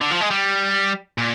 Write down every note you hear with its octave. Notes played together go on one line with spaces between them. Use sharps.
D3
F3
G#3
G3
A#2